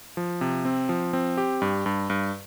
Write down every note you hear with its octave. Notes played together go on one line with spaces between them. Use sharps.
F3
C3
C4
F3
C4
G4
G2
G2
G2